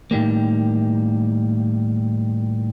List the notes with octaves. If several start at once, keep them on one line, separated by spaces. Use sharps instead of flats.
A2 D#3 G3 A#3